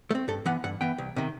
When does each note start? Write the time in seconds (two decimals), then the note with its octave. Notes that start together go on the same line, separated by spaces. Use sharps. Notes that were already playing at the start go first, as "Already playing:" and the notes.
0.11 A3
0.15 C4
0.28 G2 A4
0.46 E3 B3 F#5
0.64 G2 F#5
0.81 E3 B3 G5
0.98 C2
1.16 C3 D#3